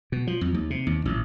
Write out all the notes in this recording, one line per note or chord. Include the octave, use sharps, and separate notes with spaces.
B2
F3
F2
D#2
C3
D#2
A1